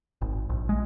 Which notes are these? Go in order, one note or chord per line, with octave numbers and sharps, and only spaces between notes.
G#1
A#1
G#3